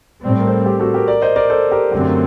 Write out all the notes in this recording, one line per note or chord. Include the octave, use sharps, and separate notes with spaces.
A2 G3 C4 D5
C5
A#4
A4 C5
G4
F#4 A4
G4 A#4
A#4 D5
C5 D#5
A#4 D5
A4 C5
G4 A#4
F#2 D3 A3 C4 G4 A#4
A#4